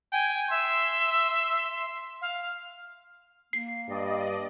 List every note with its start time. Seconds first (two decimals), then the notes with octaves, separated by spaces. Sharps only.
0.12 G5 G#5
0.50 E5 C6
2.21 F5
3.53 A#3 C7
3.89 G2 D5 D#5